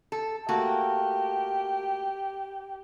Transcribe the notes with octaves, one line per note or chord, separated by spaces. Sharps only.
A4
A3 A#3 F#4 G4